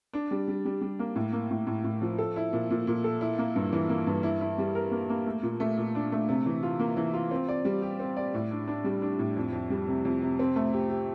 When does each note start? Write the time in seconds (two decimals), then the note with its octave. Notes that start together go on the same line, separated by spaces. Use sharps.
0.13 D4
0.31 G3
0.48 G3
0.65 G3
0.81 G3
0.99 A#3
1.16 A2
1.33 A#3
1.51 A2
1.67 A2
1.84 A2
2.02 F3
2.19 A4
2.36 E4
2.53 A#2
2.70 A#2
2.87 A#2
3.04 A4
3.21 E4
3.38 A#3
3.56 G2
3.73 E3
3.89 A#3
4.07 G2
4.23 E4
4.41 E4
4.58 G3
4.75 A#4
4.91 A#3
5.09 A#3
5.27 A3
5.43 A#2
5.60 A3
5.77 A#2
5.95 D4
6.12 A3
6.29 C3
6.46 E3
6.63 F4
6.80 A#3
6.97 E3
7.14 F4
7.31 C4
7.49 D5
7.65 G3
7.82 G4
8.00 C4
8.17 D5
8.34 A2
8.51 D4
8.68 D4
8.84 G3
9.02 D4
9.19 A2
9.37 F2
9.53 F2
9.70 G3
9.88 C3
10.05 F2
10.22 C3
10.39 C4
10.56 A3
10.73 G4
10.90 G4